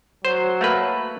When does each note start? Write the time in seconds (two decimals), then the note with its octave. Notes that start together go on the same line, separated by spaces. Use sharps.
0.25 F#3 C5
0.61 A3 A#3 B4